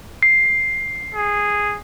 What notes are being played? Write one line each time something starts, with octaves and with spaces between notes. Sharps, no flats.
C7
G#4